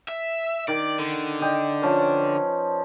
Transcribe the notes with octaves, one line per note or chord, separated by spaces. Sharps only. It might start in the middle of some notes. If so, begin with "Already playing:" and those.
E5
D#3 D5
D3
D5 D#5 G5
F3 C#4 B4